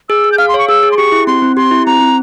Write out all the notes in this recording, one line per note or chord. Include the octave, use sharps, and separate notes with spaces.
G#4 E6
G#4
G6
F5 F6
C6
C#5 C#6
G#4 E6
G#4
C6
G4 C#6
E4
C4 C6
C4
G4 C6
E4
C4 A#5
C4